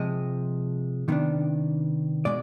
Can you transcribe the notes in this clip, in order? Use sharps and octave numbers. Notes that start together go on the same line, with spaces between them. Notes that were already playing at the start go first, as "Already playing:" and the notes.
Already playing: C3 F3 G#3 D#5
C3 D#3 B3 D4
B2 G#3 D5